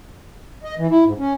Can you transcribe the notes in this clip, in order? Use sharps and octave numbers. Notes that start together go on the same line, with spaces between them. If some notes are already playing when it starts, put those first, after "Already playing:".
D#5
E3
E4
G#2
C#4